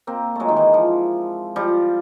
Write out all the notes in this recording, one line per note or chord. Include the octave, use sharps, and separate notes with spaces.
A#3 C4
F#3 G#3 A3
D#3
E3
F3
F3 G3